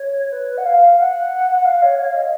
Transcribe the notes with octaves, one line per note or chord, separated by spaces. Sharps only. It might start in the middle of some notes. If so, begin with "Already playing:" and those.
Already playing: C#5
B4
F#5
F5
F#5
F#5
F5
C#5
C#5
F5
D#5